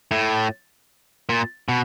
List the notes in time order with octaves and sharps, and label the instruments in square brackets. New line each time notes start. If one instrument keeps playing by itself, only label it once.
[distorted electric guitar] A2
A#2
B2